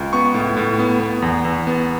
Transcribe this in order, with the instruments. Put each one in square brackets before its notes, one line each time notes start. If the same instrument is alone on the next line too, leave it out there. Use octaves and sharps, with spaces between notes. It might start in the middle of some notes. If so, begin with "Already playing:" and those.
Already playing: [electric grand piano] C#2
B3 C#6
A2
A2
B3
B3
E2
E2
B3